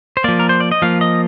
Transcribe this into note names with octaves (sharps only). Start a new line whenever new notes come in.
C5
F3 A#3 D5
A#4
C5
D5
D#5
F3 A#3 F5
D#5